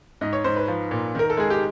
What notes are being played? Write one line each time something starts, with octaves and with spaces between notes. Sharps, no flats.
G#2 D#5
C#5
G#2 C5
B4
F3
A#2
D#3 A#4
A4
G#3 G#4
G4